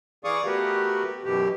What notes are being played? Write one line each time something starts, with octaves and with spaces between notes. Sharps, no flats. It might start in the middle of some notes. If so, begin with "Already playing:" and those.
E3 G#4 D5 F5 C#6 D#6
A3 B3 F#4 G4 A#4 B4
F#2 B2 E3 G4